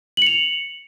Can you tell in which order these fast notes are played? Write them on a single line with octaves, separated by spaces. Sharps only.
F#7 C#7 F7